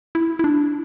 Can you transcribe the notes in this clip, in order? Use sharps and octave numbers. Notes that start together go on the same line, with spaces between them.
E4
E4
D4